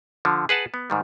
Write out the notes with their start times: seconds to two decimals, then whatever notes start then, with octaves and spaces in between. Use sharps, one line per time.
0.25 D3 F3
0.49 G#4 B4 F#5 A5
0.74 B3
0.90 G#2 D#3 G3